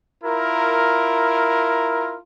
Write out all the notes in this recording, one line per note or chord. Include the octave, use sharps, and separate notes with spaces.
E4 F4 A#4